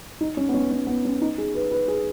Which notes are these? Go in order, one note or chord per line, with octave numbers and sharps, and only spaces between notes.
D#4
C#4
B3
C#4
C#4
B3
C#4
D#4
G#4
B4
B4
G#4